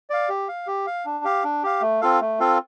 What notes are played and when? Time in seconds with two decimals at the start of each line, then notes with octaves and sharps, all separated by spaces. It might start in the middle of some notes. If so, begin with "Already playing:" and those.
0.10 D5 F5
0.29 G4
0.48 F5
0.67 G4
0.87 F5
1.06 D4
1.24 G4 F5
1.44 D4
1.63 G4 F5
1.82 A3
2.01 C4 F4 A4 F5
2.21 A3
2.40 C4 F4 A4 F5